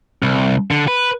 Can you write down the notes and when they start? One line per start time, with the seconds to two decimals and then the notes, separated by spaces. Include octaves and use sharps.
0.23 C2
0.71 D3
0.88 B4